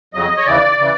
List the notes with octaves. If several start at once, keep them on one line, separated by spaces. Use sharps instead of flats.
F2 C#3 F#3 D#5
C#5
D#2 C#3 E3 D5
C#3 E3